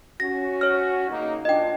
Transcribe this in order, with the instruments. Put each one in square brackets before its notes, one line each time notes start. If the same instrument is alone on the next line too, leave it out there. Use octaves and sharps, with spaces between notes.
[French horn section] C#4 F#4 [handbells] A#6
[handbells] C#5 F6
[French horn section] C#3 A#3 D#4
[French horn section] A#2 D4 [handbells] D#5 G5